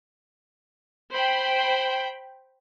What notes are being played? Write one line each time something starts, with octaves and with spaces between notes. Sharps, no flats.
C5 G5 B5